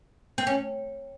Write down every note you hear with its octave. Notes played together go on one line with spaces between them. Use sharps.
C4
C#4